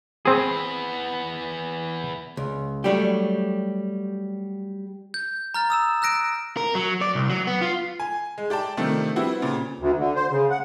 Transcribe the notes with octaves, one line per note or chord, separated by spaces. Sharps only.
B3 C4 E4 G#4
C#2
F#3 G3 A3 D4 G4
G6
A#5 F6 A6
D#6 E6 E7
E6 F#6 A#6 D7
A#4
F#3
D5
C2
F#3
B3
F4
G#5
G#3
G4 D5 G5 A5
C3 D#3 F3 A3 D4
G3 B3 C4 E4 F#4
A#2 C#3
D2
D3
C5
C#3
F#5